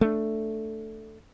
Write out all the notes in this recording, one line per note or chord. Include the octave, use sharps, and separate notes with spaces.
A3 D4